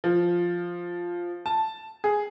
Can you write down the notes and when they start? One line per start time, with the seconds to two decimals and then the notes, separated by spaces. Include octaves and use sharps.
0.04 F3
1.46 A5
2.04 G#4